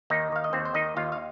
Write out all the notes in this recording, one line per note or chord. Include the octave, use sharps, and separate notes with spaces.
D#2 D#3 D#4
D#3 F5
D#5
D#2 C4 C5
C5
D#3 D#4 D#5
D#2 F4 F5
F5